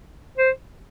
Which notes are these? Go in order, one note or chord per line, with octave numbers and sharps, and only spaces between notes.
C5